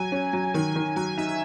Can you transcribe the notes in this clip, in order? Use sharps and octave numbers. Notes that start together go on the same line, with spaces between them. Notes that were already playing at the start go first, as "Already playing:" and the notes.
Already playing: F#3 G#5
C#4
F#3
D#3 G#5
D#3
F#3 G#5
D#4 E5
E5